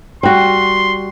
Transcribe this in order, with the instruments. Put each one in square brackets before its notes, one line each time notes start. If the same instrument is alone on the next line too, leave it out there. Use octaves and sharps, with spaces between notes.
[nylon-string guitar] G3 F#4 [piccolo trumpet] C6